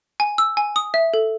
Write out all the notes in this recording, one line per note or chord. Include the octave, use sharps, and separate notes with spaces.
G#5
E6
G#5
D#6
E5
A4